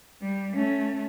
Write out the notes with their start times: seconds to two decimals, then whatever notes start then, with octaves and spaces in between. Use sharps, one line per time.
0.22 G3
0.54 A3 C#4